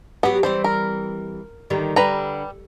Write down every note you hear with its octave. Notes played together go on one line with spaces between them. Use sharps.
F#3 B3 G4
E3 G3 C4 C5
A#4
D3 D#3 G3
D3 G3 B4 A#5